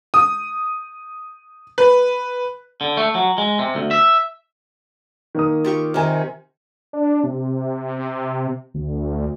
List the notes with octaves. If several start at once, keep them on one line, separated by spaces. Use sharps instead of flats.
D#6
B4
D3
A3
F#3
G#3
C3
D2
E5
D#3 A#3 D#6
F4 G4 C#6
C3 D#3 A#4 G#5
D4
C3
D2